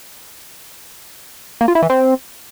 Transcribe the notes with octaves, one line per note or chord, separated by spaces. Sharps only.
A#3
F4
E4
E3
C4